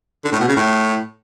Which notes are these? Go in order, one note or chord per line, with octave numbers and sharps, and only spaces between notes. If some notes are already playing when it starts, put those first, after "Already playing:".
D3
A2
B2
C#3
A2